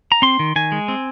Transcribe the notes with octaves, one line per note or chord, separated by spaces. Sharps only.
A#5
C4 C6
D#3
D#3 G#5
G#3
C4